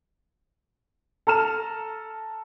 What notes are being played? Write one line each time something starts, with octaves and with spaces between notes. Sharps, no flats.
A4 A#5 F6 E7